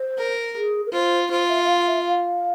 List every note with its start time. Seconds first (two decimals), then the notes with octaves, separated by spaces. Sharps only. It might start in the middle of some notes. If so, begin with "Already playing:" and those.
Already playing: C5
0.17 A#4
0.55 G#4
0.86 A#4
0.92 F4 C5
1.30 F4 C5
1.49 E5
1.64 E5
1.68 F5
1.87 E5
2.06 F5